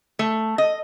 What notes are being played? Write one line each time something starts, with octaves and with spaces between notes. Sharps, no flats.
A3
D#5